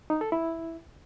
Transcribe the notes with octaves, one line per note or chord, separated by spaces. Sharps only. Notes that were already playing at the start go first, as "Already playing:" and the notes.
D#4
A4
E4